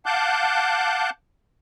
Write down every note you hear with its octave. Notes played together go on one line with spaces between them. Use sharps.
F5 F#5 A5 D6 F#6 G6